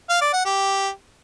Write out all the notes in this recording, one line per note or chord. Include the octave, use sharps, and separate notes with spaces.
F5
D5
F#5
G4